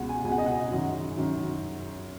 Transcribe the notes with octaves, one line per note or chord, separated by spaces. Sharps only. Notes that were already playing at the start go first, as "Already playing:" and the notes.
Already playing: C#2 B2 F#5
G#5
C#2 B2 F#5 G#5
D#5
F#5
F#2 D#3
F#2 D#3